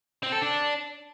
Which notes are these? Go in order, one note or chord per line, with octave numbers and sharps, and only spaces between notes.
C4
A4
D4